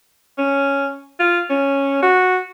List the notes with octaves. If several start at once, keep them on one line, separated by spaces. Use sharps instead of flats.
C#4
F4
C#4
F#4